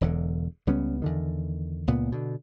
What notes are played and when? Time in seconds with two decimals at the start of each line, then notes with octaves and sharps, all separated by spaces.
0.01 E1 E2 D3
0.67 C#2 G3 B3 C#4
1.02 E2 D3 D#3
1.87 C#2 A#2 B3
2.12 B2 D3